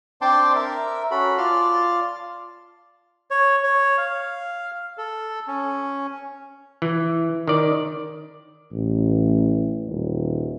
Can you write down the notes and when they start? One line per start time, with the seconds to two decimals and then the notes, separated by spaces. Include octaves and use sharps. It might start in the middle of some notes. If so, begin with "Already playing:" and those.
0.22 C4 D4 G5 A5 C6 D6
0.55 A#4 E5
1.11 C#4 F#4 A4 B5
1.38 F4 D5 A5 C6 F6
3.31 C#5
3.64 C#5
3.98 F5
4.98 A4
5.48 C#4
6.82 E3
7.48 D#3 D5
8.72 A1
9.87 D#1